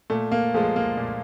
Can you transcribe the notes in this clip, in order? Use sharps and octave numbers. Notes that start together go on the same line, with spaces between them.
A#2 A3
A#3
F3 G#3 A3
A#3
A#2